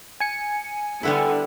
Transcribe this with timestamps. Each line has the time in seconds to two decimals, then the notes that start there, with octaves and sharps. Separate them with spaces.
0.20 G#5 C#7
1.03 D3 G3 B3 E4